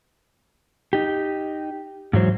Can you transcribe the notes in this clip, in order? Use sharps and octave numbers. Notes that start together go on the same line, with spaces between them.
D#4 G4
G#2 E3 F#3 C5